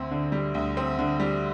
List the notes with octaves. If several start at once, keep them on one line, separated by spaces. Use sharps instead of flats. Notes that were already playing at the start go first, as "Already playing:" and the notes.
Already playing: D2 C4
D3
G3
D2
C4
D3
G3